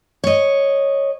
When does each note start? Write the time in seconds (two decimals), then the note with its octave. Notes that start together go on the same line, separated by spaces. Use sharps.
0.24 C#5 D#5